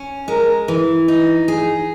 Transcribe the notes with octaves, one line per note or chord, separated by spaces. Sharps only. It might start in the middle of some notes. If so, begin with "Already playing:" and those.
Already playing: C#4
G#3 A#4
E3
D#4
G#4